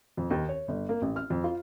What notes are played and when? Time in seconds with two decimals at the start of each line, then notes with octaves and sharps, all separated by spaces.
0.17 F2
0.30 D#2
0.49 C#5
0.68 G1
0.89 A#3
1.02 A1
1.16 F6
1.30 F2
1.44 F4